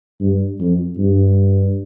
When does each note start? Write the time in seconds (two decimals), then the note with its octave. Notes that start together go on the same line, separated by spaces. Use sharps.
0.20 G2
0.59 F2
0.98 G2